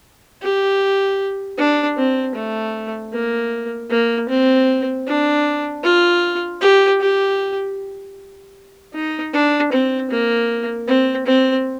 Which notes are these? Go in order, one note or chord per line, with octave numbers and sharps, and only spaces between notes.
G4
D4
C4
A3
A#3
A#3
C4
D4
F4
G4
G4
D#4
D4
C4
A#3
C4
C4